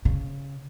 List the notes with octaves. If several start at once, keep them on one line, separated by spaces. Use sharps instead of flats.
C#3